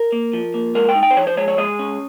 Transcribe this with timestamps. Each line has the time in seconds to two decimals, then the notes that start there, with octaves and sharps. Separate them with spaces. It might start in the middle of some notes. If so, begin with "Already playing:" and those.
Already playing: A#4
0.12 A#3
0.33 F3
0.54 A#3
0.75 G#3 A#4
0.89 G5
0.95 D#4
1.03 G5
1.11 C5
1.17 F3 C#5
1.27 C5
1.37 G#3 C#5
1.48 C#5
1.58 G#3 D#5
1.79 C#4